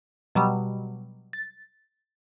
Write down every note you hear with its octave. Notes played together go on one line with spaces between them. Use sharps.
B2 F#3 G3
A6